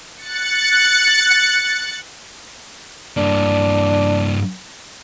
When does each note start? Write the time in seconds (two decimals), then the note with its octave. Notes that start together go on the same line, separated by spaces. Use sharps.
0.17 F#6 A6 C#7
3.17 G2 A#3 D4